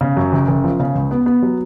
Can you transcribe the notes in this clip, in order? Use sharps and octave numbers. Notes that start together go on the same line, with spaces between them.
C#3
F#2
F#1
F#1
F3
C#3
C#2
B3
B3
F#3